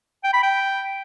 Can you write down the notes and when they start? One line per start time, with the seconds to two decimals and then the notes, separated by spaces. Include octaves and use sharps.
0.24 G5
0.33 B5
0.43 G5